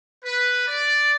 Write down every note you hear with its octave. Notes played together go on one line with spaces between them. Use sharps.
B4
D5